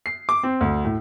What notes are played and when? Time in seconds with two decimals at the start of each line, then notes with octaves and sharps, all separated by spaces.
0.06 C7
0.29 D6
0.43 C4
0.61 D2
0.85 A2